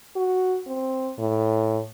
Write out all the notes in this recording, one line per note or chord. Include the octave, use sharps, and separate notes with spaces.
F#4
C4
A2